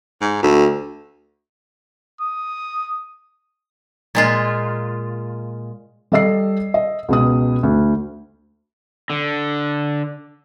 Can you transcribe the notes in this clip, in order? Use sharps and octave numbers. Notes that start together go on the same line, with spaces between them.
G#2
D2
D#6
A#2 G#3 F4
G3 A4 D#5 E6 C7
D#5
C#2 B2 D#6
D2
D3